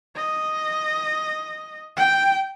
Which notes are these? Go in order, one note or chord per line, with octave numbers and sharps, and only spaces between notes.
D#5
G5